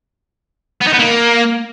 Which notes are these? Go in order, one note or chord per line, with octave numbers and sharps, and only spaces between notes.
B3
D#4
B3
A#3